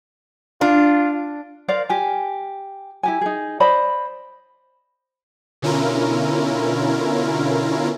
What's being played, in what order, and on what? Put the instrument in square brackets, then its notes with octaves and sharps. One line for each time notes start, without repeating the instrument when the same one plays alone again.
[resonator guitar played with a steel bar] D4 [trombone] F4
[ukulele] A#4 C5 D5 F5
G4 G#5
E4 G4 G#5
D#4 G#4
C5 D5 D#5 B5
[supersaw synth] B2 D3 C#4 E4 F4 A#4